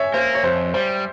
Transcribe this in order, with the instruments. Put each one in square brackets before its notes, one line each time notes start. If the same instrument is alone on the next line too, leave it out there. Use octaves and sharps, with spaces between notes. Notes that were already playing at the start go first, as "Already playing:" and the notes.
Already playing: [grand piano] C#5 E5 G#5
[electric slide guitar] A#3 [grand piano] C5
[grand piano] C#5
[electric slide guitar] F2 [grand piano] C5
[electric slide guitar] G3 [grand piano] C5